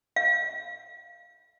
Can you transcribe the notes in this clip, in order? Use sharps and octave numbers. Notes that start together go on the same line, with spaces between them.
F5